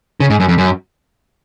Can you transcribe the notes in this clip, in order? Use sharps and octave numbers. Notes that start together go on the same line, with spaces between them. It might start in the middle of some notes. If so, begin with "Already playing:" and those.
C#3
G#2
F#2
F2
F#2